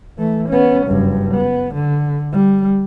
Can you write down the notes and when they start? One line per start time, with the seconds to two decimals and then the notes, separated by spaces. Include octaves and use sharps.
0.18 E3 A3
0.49 B3 C#4
0.87 F#1 G2
1.34 B3
1.75 D3
2.32 G3